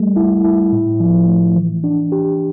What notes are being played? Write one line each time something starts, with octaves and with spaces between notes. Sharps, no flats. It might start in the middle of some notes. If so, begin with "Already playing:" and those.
Already playing: G3 A3
E4
E4
A2
F3
A3
E3
D4
G4